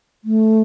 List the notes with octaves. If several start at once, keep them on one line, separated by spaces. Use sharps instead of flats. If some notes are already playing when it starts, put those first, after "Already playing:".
A3